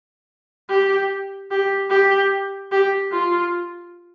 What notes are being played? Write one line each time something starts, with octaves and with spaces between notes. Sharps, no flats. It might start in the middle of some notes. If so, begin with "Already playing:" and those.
G4
G4
G4
G4
F4